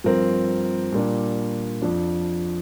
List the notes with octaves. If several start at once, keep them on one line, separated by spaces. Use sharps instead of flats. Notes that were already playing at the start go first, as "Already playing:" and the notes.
G2 F3 C4 A#4
A#2 G3 A#3 D4
F2 F3 D4